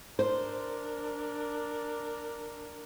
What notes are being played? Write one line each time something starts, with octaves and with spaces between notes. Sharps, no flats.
D4 A#4 C5